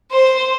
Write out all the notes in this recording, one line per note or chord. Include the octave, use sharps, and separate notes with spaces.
C5